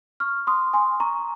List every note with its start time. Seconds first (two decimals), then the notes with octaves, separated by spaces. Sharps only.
0.20 C#6 F6
0.47 C6 D#6
0.73 G#5 C6
1.00 A#5 C#6